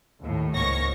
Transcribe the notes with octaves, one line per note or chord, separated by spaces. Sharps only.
D#2 A2
C#2 G#2 A#3 C#5 C#6 A#6